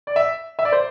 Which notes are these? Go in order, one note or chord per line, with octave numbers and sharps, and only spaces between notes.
D5
E5
E5
D5
C5